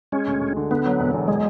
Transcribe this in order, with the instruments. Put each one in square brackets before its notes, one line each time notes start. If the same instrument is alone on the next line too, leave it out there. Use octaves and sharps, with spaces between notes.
[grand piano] G#3 [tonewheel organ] C#4
[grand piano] D2
D2
D3
[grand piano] D3 [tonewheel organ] B3
[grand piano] F#3
E1
E2
[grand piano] F#3 [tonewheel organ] G#3